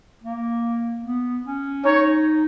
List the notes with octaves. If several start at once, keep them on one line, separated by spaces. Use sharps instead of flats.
A#3
B3
C#4
D#4 C#5